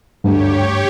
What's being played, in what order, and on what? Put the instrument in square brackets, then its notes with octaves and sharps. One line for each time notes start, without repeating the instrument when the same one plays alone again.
[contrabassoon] D2 [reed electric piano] G2 [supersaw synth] G4 C#5